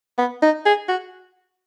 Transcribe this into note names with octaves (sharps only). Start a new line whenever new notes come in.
B3
D#4
G#4
F#4